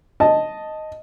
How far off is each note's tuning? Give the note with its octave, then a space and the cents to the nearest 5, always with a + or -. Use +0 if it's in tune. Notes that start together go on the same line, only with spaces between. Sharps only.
D#5 +0 A5 +0